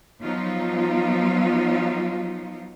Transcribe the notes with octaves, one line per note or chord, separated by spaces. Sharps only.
F3 F#3 B3 D#4 F4